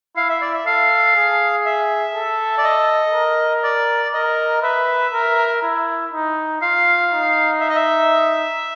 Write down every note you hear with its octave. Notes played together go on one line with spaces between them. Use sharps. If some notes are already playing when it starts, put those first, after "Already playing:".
E4 F5
E5
D5
E5
A4 F5
G#4
E5
A4
D5
D#5
A#4
D5
A#4 D#5
B4 E5
A#4
E4
D#4
F4 F5
D#4
E5
D#5
E5